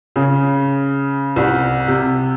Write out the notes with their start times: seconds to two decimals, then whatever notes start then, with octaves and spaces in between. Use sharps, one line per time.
0.16 C#3
1.36 C2
1.88 C3